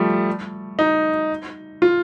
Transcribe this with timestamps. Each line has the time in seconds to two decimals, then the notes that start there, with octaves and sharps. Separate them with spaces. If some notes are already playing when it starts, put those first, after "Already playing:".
Already playing: F3 G3 A3
0.79 D#4
1.82 F4